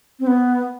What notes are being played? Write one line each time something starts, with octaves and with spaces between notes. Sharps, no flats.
C4
B3